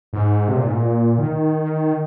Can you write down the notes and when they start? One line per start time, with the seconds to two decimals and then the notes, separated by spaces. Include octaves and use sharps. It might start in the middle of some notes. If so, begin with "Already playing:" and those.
0.13 G#2
0.48 C3
0.56 A#2
0.65 G#2
0.73 A#2
1.18 D#3